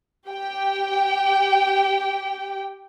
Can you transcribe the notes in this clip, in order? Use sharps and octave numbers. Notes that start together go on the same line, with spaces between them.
G4 G5